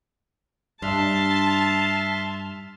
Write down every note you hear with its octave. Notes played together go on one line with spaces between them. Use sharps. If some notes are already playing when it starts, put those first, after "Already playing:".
G2 D4 E5 A5 C6 F6